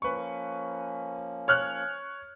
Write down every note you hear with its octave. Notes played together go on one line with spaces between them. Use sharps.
F3 A#3 C#4 B4 C#6
C#5 F6 F#6